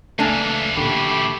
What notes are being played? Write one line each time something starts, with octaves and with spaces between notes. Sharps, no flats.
C#2 F#2 E3 A3 A#3 D4 G#5
A#2 D3 A3 G4 B5